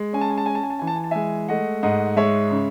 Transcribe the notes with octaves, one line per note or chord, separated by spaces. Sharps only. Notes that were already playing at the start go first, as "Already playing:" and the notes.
Already playing: G#3
C#4 G#5
A5
G#5
A5
C#4 G#5
A5
G#5
A5
E3 G#5
A5
G#5
A5
G#3 E5 G#5
A3 D#5 F#5
G#2 D#5 F#5
G#3 C#5 E5
C#3